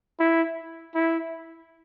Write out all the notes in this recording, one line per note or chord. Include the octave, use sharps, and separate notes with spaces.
E4
E4